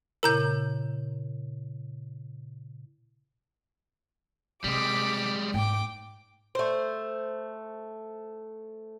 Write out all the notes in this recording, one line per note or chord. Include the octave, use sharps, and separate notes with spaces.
A#2 C#3 E4 A#4 A#5 G6
C3 G3 G#3 D6 B6
G#2 A3 G5 D6
A3 C5